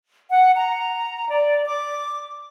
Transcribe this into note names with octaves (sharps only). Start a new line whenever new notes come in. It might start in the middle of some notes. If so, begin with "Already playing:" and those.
F#5
A#5
D5
D6